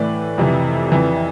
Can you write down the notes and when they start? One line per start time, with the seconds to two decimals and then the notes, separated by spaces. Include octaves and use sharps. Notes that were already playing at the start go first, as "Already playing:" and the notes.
Already playing: A2 E3 B4 D5
0.38 F2 C3 E3
0.92 F2 E3